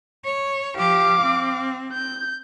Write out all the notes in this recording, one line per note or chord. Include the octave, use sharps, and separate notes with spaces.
C#5
F3 G4 F5 D6
C4
G6